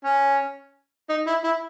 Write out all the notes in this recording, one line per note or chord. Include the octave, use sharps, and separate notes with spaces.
C#4
D#4
E4
E4